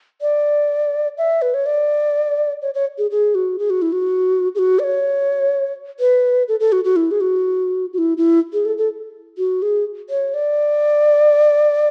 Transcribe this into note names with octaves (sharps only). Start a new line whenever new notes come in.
D5
E5
B4
C#5
D5
C#5
C#5
G#4
G#4
F#4
G#4
F#4
E4
F#4
G#4
F#4
D5
C#5
B4
A4
A4
F#4
F#4
E4
G#4
F#4
F#4
E4
E4
G#4
A4
A4
F#4
G#4
C#5
D5